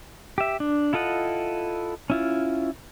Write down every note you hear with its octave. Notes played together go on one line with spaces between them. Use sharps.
G4 E5
D4
E4 F4 A4 D#5 F#5
C#4 E4 F4